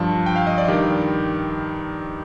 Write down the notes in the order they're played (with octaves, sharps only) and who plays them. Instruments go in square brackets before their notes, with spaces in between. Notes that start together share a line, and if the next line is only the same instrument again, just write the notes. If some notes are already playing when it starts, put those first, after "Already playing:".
Already playing: [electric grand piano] G2 F3 A5
G5
F5
D#5
D5
G2 D#3 G4